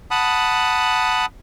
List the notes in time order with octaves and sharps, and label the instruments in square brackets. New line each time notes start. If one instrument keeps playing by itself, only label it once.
[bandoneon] F#5 A5 B5 D#6